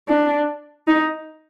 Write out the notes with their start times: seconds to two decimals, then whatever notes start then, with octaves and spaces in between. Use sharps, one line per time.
0.08 D4
0.88 D#4